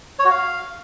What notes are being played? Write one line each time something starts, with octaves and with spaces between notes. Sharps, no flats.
C#5
F#4
F5